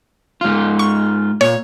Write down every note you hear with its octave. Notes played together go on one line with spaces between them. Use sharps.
G#2 F4
C#6
A#2 C#5